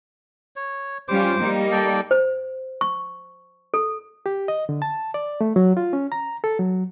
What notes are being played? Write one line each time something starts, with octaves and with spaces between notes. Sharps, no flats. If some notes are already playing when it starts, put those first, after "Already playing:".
C#5
G3 C#4 F4 C5 D6
G3 A#3 D#4
A4 D5 G5
C5
C#6
A4
G4
D#5
D3
A5
D5
A3
F#3
F4
C#4
A#5
A4
F#3